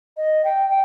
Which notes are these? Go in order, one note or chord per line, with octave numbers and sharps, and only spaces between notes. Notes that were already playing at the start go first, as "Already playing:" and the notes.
D#5
G5
G5